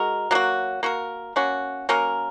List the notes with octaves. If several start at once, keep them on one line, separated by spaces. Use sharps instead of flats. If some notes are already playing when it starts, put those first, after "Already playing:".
Already playing: G#3 F#4 A#4
F#3 A#3 F#4
A#3 F#4 A#4
A#3 C#4 F#4
F#3 A#3 C#4 A#4